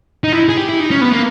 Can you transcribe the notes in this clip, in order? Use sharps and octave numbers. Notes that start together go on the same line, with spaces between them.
D#4
E4
G#4
G4
E4
D#4
C#4
B3
A#3